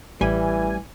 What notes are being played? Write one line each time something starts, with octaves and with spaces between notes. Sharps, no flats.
A1 E3 G3 G#5